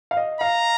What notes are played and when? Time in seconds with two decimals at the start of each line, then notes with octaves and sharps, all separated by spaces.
0.11 F5
0.17 D#5
0.41 F5 A#5